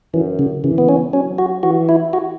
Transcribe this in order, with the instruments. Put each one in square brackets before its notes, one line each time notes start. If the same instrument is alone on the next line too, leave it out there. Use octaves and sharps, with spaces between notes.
[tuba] F#2 [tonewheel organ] E3
[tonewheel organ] C#3
[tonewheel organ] C#3 [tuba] E3
[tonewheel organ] B3
C#4
[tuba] F#3 [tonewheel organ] C#4
[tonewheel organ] F#4
[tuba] E3 [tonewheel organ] F#4
[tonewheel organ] E4
F#4